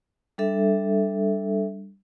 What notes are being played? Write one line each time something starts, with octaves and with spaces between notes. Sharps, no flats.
G3 D4 A4 E5